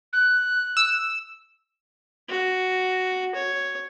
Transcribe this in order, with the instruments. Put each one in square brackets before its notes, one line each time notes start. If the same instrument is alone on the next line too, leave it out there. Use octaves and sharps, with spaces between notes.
[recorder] F#6
[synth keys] E6
[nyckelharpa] F#4
C#5